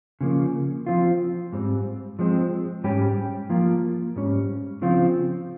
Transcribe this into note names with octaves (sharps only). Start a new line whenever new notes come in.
C#3 F3 A#3
F3 C4 F4
G#2 G3 C4
F3 G#3 C4
G#2 G3 C#4 G4
F3 A#3 F4
G#2 G3 C#4
C#3 F3 C4 F4